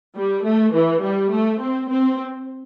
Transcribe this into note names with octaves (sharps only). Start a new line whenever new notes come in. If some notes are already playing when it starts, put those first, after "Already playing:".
G3
A3
E3
G3
A3
C4
C4